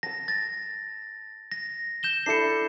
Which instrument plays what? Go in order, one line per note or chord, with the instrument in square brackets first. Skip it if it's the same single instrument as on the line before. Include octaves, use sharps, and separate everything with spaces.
[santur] A5 E6 [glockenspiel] A#6
[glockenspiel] A6
A#6
G6 E7 G7
[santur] D4 E4 A4 [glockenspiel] C7 C#7